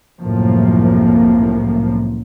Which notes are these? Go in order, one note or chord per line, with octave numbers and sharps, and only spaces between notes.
C2 F#2 A2 F3 A#3